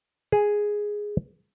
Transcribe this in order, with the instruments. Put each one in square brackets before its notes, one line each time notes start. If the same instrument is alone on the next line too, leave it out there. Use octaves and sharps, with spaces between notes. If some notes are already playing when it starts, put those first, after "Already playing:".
[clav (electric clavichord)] G#4